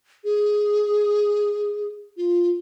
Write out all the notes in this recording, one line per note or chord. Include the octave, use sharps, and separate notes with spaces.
G#4
F4